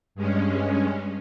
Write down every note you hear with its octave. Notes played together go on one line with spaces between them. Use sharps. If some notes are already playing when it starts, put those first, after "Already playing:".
G2 G#3 C#4